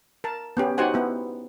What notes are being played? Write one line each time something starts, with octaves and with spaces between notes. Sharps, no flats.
A#4 A5
B3 C#4 G4
D#4 F#4 G4 C5 F#5 G#5
B3 E4